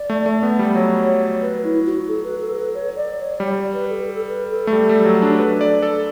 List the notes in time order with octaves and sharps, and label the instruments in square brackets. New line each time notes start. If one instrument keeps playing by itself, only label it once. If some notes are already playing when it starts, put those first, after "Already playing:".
Already playing: [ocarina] D5
[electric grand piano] A3
A3
B3
G3
[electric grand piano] F#3 [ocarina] C#5
[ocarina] B4
E4
F#4
A4
B4
A4
B4
C#5
D5
C#5
[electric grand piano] G3 [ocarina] D5
[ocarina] B4
A4
A4
B4
A4
[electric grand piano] A3
G3
G3
F#3
D4
B4
D5
A4